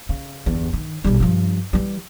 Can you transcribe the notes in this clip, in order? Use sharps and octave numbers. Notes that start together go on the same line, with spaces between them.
C#3
G1 E2
D#3
B1 G3
G2 F3
E3 G3